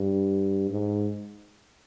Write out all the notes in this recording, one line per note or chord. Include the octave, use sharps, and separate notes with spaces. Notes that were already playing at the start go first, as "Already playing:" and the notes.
Already playing: G2
G#2